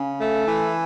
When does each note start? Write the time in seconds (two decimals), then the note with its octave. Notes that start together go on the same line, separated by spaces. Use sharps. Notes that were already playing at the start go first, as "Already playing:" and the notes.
Already playing: C#3
0.19 A3
0.48 E3